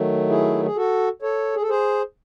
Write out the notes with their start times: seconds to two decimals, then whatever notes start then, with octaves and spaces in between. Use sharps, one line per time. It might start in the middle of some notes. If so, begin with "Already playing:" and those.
Already playing: D#3 F#3 A3
0.29 E4 G#4
0.65 G#4
0.76 F#4 A4
1.22 A4 C#5
1.55 G#4
1.62 A4
1.69 G#4 C5